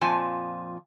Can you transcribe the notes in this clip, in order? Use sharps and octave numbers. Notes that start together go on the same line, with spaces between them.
F2 A#2 F3 G#5 A5